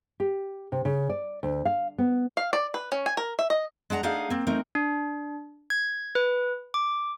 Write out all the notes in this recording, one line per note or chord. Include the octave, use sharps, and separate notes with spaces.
G4
C3
C#3
D5
D2
F5
B3
F5
D5
B4
C#4
G#5
A#4
E5
D#5
G#3 D4 F#5 A5 A#5
A3 D4 D#4 G#4 F5 F#5
A#3 C4
A3 C4 D#4 A#4
D4
G#6
B4
D6